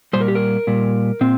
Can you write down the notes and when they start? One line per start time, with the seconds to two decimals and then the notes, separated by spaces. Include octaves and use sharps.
0.13 A#2 G3 C5
0.21 A#4
0.28 G4
0.35 A#4
0.67 A#2 G3
1.21 A#2 C4